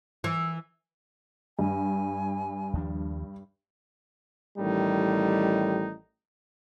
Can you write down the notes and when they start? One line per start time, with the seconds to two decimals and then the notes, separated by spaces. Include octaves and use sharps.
0.24 E3
1.59 G2 G#5
2.73 D#2 F3 D4
4.59 A1 A2 D#3 G3 D#4